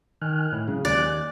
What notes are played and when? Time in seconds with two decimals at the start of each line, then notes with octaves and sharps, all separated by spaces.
0.22 D#3 G#5 F6 F#6
0.52 A2
0.68 C#3 F#3 G#3 C#4
0.85 D#2 D5 G#5 F#6